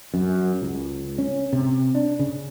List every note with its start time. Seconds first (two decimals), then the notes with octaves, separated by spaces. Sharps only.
0.14 F#2
0.62 C#2
1.18 C#4
1.53 C3
1.95 D4
2.19 C#3